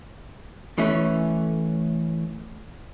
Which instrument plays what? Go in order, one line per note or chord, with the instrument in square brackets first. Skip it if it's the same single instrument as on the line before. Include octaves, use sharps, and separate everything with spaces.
[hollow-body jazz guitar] E3 A3 C#4